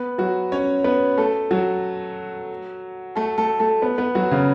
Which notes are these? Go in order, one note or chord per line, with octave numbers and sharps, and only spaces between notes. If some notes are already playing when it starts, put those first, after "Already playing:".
Already playing: B3 B4
F#3 F#4
C#4 C#5
B3 B4
A3 A4
F#3 F#4
A3 A4
A3 A4
A3 A4
B3 B4
B3 B4
F#3 F#4
C#3 C#4